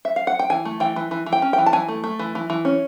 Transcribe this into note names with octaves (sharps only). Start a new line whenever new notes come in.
E5
F5
F#5
G5
E3 G#5
A3
E3 G5
E3
E3
E3
G5
C#4
G5
E3
A5
E3 G#5
A3
A3
E3
E3
E3
C#4